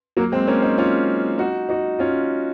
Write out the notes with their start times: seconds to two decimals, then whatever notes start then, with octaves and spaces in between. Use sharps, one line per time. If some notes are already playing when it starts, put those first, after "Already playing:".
0.17 F#3 A#3
0.32 G#3 C4
0.47 A#3 C#4
0.62 C4 D#4
0.78 C#4 F4
1.38 D#4 F#4
1.69 D#4 F#4
1.99 C#4 F4